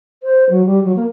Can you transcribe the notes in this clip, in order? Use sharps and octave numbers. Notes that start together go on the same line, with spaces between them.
C5
F#3
G3
F#3
A#3